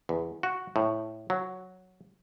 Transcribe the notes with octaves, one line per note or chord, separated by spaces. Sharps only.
E2
F#4
A2
F#3